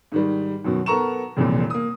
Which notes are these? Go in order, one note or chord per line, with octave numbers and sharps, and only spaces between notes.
G#2 D#3 G3
F#2 B2 D#3
B3 A4 A#4 A#5 C#6 E7
E1 C2 F2 A#2
A#3 D#6